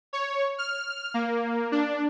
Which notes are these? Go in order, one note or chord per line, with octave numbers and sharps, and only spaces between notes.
C#5
F6
A#3
D4